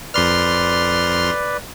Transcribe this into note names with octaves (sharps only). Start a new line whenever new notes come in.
F2 B4 D5 C6 F6